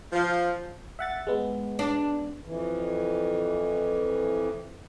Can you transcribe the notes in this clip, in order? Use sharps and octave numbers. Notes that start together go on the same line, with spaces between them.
F3
E5 F#5 A6
G#3 B3
D4
F2 E3